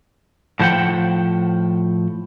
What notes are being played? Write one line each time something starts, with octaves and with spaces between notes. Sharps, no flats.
A2 F3 C5 F#5 G5